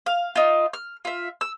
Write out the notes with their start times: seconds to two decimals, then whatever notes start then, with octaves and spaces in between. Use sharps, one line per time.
0.06 F5
0.36 D#4 F4
0.73 F6
1.05 F4 E5
1.41 E6